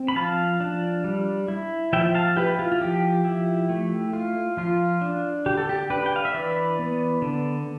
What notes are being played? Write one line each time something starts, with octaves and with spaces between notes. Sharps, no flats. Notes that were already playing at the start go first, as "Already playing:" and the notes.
Already playing: C4
B5
F3 F5 A5
D4
G3
E4
F3 E5 G5
F5 A5
E4 G4 B4
F4
F4
F3 G4
E4
A3
F4
F3 F4
D4
D3 G4
A4
G4
D4 G4 B4
G5
F5
E5
E3 B4 D5
B3
D3